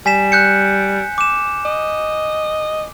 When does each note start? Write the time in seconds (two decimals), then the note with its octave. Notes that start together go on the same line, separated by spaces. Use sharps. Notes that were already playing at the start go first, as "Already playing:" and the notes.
0.06 G3 G#5 B6 E7
0.32 F#6 G6 C#7
1.18 D6 E7
1.65 D#5